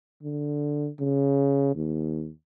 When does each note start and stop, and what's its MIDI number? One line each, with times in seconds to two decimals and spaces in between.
0.23 0.90 50
1.00 1.72 49
1.75 2.31 39